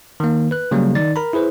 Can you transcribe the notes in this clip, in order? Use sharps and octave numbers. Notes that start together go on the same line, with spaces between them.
D#3 A#3
B4 F#6
C#3 F#3 G3 A#3
D#3 D#4 D5 A6
A#4 A#5 B5
E4 G#4 B4 C5